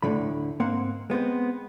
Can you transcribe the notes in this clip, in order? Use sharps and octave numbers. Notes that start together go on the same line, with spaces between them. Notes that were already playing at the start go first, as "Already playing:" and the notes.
D2 A2 D3 D#3 B5
G#2 A#3 C4 C5 F#5
G#3 B3 C4 C5